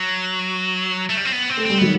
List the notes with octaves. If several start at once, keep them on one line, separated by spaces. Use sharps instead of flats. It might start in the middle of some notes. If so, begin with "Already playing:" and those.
Already playing: F#3
A3
G3
C4
B3
C4
A3
G3 C4
D#3 F#3 B3